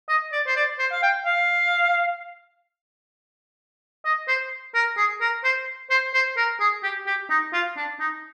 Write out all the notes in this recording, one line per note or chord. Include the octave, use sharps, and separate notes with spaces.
D#5
D5
C5
D5
C5
F5
G5
F5
D#5
C5
A#4
G#4
A#4
C5
C5
C5
A#4
G#4
G4
G4
D#4
F4
D4
D#4